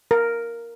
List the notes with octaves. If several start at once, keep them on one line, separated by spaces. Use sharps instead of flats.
A#4